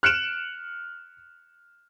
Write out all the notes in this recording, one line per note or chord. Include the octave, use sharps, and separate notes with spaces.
F6 F#6 C#7 D7 E7 F#7